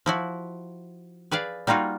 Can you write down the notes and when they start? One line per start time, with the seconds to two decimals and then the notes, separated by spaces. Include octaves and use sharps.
0.06 F3 E4 F#4
1.31 G#4 B4 D5 F5
1.67 G3 A#3 D#4 F4 F#4